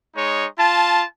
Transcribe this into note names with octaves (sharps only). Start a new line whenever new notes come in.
G#3 D#4 C#5
F4 A5